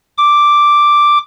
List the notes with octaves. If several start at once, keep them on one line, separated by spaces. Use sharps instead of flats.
D6